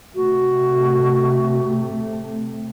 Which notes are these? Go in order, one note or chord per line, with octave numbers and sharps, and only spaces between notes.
C3 A3 F#4